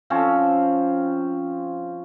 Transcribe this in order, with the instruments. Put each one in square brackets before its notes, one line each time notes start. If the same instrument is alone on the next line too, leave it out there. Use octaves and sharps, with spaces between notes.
[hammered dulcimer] F3 C4 C#4